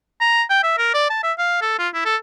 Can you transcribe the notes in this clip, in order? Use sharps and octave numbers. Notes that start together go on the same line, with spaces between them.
A#5
G5
E5
A#4
D5
A5
E5
F5
A4
F4
E4
A4